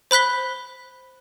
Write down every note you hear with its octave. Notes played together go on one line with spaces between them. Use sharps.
C5 B5 F#6 B6 G7